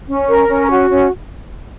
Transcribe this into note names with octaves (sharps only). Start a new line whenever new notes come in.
C#4
A#4
C#4
F#4
C#4